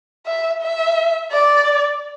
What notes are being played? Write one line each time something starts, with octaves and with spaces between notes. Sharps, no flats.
E5
E5
D5